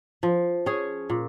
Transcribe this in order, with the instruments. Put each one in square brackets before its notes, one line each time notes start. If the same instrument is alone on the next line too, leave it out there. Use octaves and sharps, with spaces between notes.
[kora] F3
C#4 G#4
A#2